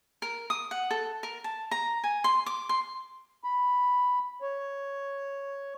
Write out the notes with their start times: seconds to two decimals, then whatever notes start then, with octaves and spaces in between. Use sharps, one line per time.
0.22 A#4
0.50 D#6
0.71 F#5
0.91 A4
1.23 A#4
1.44 A5
1.71 A#5
2.04 G#5
2.24 C6
2.46 D6
2.69 C6
3.44 B5
4.42 C#5